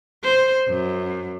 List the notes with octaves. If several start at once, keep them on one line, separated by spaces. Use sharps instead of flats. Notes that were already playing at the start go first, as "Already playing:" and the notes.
C5
F#2